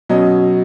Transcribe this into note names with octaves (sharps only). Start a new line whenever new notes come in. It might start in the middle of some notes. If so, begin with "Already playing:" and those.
B2 F#3 C#4 D#5